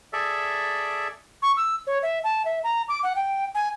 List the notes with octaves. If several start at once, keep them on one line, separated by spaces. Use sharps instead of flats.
G#4 A4 D5 E5
C#6
E6
C#5
E5
A5
E5
A#5
D6
F#5
G5
G#5